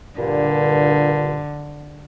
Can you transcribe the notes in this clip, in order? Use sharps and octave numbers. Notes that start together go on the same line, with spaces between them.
G2 A#2 D3